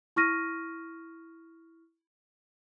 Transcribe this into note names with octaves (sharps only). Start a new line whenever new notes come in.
E4 C#6 F6 A#6 D#7